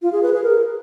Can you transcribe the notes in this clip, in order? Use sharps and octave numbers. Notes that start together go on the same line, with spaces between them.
F4
G#4
B4
G#4
A#4